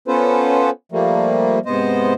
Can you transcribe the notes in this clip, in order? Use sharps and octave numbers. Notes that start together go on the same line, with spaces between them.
B3 C#4 F4 A4 B4 C5
F3 G3 A3 A#3
G#2 C3 B3 C5 D#5